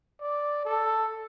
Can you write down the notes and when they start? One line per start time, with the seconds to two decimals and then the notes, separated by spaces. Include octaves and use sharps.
0.21 D5
0.65 A4